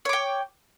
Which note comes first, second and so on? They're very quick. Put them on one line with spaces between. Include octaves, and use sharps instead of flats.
C#5 D6 G5